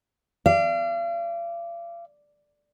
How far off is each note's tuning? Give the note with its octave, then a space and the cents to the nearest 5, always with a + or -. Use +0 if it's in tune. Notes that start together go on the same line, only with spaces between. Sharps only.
D5 +0 F5 -40